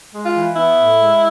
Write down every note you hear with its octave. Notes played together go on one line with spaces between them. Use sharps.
G#3
F4
E3
B3 E4
A2
G#3